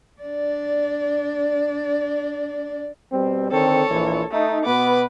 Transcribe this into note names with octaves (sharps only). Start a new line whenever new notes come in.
D4 D5
B2 G3 C4
D3 D#3 C4 A4 C#5
A#1 E3
A3 D#4
B2 B3 B4 D6